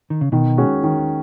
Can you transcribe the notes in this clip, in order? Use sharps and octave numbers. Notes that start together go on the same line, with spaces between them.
D#3
C#3
B2 D#3
G#3 C#4 F#4
D#3